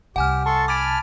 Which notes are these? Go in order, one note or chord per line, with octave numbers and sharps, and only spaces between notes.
C2 C3 G4 F#5 G#5 F6
A4 A5 C6 C#6
G#5 B5 D6 F6 A6 D7